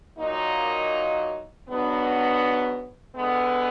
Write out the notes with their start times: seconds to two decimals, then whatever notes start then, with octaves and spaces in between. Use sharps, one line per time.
0.18 A#2 F#3 A#3 D#4
1.67 G#2 F#3 B3 D4
3.16 D3 G#3 B3